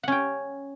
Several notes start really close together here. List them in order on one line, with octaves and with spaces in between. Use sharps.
F#5 C#4 G5